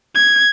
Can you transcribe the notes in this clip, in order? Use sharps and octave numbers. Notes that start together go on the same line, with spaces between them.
G#6